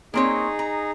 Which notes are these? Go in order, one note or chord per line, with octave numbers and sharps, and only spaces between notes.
A#3 C4 D#4 G#4 C#5
A#5